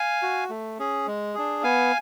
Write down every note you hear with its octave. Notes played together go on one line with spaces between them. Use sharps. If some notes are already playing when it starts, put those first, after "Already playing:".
Already playing: F5 G#5
F#4
A3
C#4 G#4
G#3
D4 G#4
B3 F5 G#5